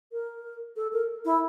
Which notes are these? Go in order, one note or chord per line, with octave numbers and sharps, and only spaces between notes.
A#4
A4
A#4
E4